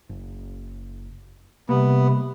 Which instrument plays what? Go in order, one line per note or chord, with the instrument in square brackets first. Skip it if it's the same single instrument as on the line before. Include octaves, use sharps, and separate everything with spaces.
[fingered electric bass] F#1
[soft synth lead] C3 [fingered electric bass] G3 A#3 [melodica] B3